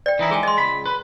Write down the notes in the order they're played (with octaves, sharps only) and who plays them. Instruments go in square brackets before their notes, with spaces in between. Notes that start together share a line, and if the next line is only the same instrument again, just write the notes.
[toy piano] D5 G5
[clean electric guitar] E3 D#4 E4
[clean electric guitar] G#3 [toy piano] G#4 G5 G#5
[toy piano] D#5 C6
[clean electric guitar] C#2 B5
B4